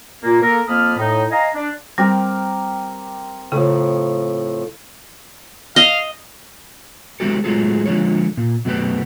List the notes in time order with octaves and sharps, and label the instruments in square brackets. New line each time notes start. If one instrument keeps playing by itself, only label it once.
[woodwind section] A#2 A#3
A#3 A4 A#4
F2 A#3 A5 B5 D#6 F6
A2 D#4
D#5 F5 G#5 A#5
D4
[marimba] G3 [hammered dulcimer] C4 G4 A#4
[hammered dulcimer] A2 F3 [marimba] C#3
[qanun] D#5 [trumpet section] F5
[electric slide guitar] G#3 E4 F#4 G4 A4
A2 F#3 G#3 F4 G#4 A4
D3 F3 G#3 F4 C#5
A#2
F#2 B2 A3 C#4 G4 B4